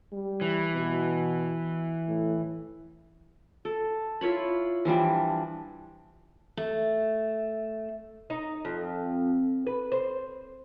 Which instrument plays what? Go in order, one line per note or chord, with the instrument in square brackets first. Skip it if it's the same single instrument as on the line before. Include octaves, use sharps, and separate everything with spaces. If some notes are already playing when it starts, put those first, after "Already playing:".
[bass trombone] G3
[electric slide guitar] E3
[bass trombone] B2
A2
[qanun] A4
E4 F4 C#5 B5
E3 F3 G3 D4
[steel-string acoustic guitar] A3
[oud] D#4
F2
B4
C5